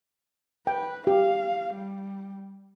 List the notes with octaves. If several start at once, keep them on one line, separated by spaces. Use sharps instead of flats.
B4 G5
G4 F5
G3